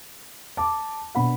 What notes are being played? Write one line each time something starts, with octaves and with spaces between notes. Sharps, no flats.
A5 D6
B2 B3 D4 F#5 B5